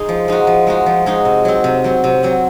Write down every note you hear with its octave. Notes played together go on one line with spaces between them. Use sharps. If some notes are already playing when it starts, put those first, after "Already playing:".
Already playing: G#3 D#4
F3
G#3 D#4 F#4
F3
G#3 D#4 F#4
F3
G#3 D#4 F#4
C3
F#3 C4
C3
F#3 C4
C3
F#3 C4